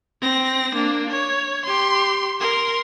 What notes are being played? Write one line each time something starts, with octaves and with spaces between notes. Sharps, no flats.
C4 A#6
A#3 D4
C#5
G4 C6
A#4 C6